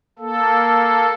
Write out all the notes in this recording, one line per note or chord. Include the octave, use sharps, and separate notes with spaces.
A#3 A4